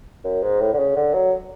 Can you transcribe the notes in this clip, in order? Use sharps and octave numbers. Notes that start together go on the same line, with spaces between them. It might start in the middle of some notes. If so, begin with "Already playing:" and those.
F#2
G#2
A2
D3
C#3
D3
F#3